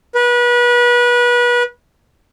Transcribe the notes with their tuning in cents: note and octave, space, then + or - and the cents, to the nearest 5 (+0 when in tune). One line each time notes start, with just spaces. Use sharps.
B4 -30